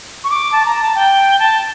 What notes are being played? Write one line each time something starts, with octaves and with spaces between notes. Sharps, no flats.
C#6
D6
A5
A#5
A5
G5
A5